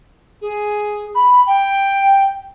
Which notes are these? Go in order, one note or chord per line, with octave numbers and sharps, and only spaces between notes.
G#4
B5
G5